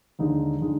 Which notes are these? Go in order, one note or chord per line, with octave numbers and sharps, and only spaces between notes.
D#2 D3 G#3 D#4
D3 G#3 D#4